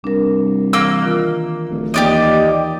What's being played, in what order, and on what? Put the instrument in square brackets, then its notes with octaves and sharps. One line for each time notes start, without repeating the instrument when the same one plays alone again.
[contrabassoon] C2 [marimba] D4 A#4
[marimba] E3 [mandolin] A#3 E6
[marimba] D#3 F4 A#4
[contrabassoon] D1
[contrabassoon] D#2 [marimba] E3 [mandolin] G4 D5 D#5